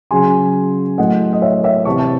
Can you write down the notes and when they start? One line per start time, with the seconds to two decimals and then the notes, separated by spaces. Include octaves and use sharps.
0.11 C#3 F#3 G#5 C6
0.98 A2 F#3 D#5 F#5
1.33 D#5
1.42 C#5 E5
1.63 C#5 E5
1.85 C3 E3 A5 C#6
1.99 A5